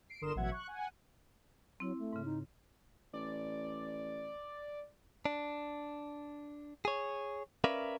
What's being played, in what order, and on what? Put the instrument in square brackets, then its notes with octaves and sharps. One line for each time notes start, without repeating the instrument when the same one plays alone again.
[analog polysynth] C7 D7
G1 D3 A#4 C6 D#6 E7
A1 B2 F#3 E5 F#5 G#6
C#6 F#6
F#5 G#5
[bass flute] F#3 [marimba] C4 E4
[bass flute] A3
[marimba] G#2 C#3
[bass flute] D#4
[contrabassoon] A1 [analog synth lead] D5
[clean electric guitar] D4
G#4 C#5
C#4 A#4 B4 D5 E5 F5